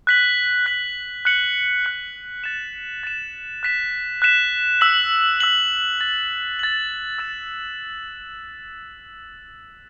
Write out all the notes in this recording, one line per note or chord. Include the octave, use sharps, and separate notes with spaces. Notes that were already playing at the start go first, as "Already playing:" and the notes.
F#6 B6 F#7
F#6 B6 F#7
F#6 C#7 F#7
F#6 C#7 F#7
A6 E7
A6 E7
F#6 B6 E7
F#6 B6 E7
E6 B6 F#7
E6 B6 F#7
A6 F#7
A6 F#7
E6 A6 E7